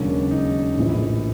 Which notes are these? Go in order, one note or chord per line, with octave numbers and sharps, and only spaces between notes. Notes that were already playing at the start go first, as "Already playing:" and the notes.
Already playing: E1 D#2 C#3 F#3 D4
D#4
A#1 A2 E3